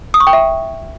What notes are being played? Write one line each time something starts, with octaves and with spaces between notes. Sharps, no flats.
D#6
C#6
G5
E5